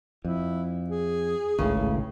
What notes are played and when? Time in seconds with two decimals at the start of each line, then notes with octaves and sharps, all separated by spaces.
0.25 F2 E4
0.90 G#4
1.59 G#1 C#2 A2 C#3